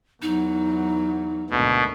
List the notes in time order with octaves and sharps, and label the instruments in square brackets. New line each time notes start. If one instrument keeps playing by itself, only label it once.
[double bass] E2 F#3 [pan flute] D#4
[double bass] G#1 D2 [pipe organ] B2